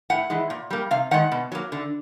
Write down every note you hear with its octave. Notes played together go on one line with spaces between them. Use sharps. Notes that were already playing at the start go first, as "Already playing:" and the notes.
A2 F#5
E3 G#3
A#2
G3 A#3
C3 F5
D#3 G#3 F#5
B2
F#3 A#3
D3